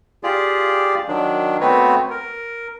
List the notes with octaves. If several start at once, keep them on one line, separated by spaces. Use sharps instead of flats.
F4 G4 G#4 D5
D#3 F#3 D4
A3 B3 C4 F#4 B4 C#5
A#4